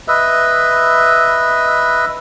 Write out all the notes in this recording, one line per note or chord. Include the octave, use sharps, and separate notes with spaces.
B4 D#5 E5